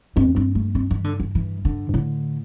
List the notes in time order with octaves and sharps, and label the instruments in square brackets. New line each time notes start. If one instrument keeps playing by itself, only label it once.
[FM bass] G2 [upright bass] C4
[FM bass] E2
[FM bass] G2 [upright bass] C4
[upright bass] A3
C4
E3
D3
E3
E3
D3
[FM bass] G2
[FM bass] A2 [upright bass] D3